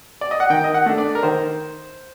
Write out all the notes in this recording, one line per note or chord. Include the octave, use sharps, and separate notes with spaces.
D5
D#5
F#5
D#3 G5
D#5
F#5
A3 D4
D5
A#4
D#3 C5